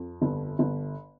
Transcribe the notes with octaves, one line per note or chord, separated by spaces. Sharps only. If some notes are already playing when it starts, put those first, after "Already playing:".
Already playing: F2
G1
G1